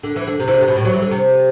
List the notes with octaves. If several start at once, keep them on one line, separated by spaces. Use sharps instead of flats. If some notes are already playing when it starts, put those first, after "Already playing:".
D3
E3
D3
C3
E3
D3
C3
B2
A2
F#3
E3
D3
C3